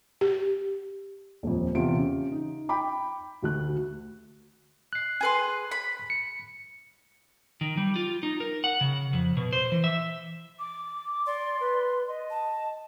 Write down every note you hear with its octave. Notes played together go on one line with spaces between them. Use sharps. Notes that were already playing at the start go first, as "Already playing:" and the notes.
G4
D#1 F2
E2 C3 F4 G4 D7
C#3
D#4
G5 B5 D6
D2 F#4 F#6
F#6 C7
G#4 B4 C6
B5
C#7
D#3
G3
F4
D#4
A#4
F#5
C#3
F2
B2
C5
E3
E5
D6
D5 C6
B4
D#5
A5